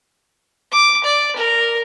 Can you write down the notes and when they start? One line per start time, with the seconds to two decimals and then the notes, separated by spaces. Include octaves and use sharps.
0.71 D6
1.04 D5
1.36 A#4